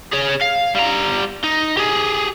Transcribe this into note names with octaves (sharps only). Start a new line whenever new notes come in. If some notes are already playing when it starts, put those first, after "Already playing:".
G#4 C#5
F5
G3 A#5
D#4
G4 G#4